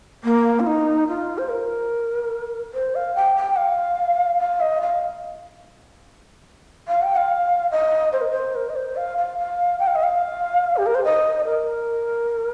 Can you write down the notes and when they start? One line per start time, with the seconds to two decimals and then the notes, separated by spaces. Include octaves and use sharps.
0.24 A#3
0.60 F4
0.66 D#4
1.08 F4
1.38 C5
1.49 A#4
2.74 C5
2.95 F5
3.15 G5
3.36 G5
3.56 F5
4.39 F5
4.60 D#5
4.81 F5
6.88 F5
7.02 G5
7.16 F5
7.71 D#5
8.13 C5
8.21 A#4
8.30 C5
8.55 A#4
8.69 D#5
8.76 C5
8.96 F5
9.17 F5
9.38 F5
9.79 G5
9.87 F5
9.95 D#5
10.03 F5
10.77 G4
10.86 A#4
10.95 C5
11.04 D#5
11.46 A#4